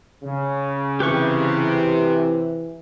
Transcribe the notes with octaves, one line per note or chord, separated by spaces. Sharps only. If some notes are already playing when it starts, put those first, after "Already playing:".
C#3
C3 E3 G4 B4 C#6